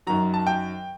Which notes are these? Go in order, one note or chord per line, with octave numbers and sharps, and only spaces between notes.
F#2 D#3 F#3 A#5
A5
G5